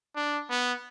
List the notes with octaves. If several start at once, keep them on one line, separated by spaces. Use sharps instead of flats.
D4
B3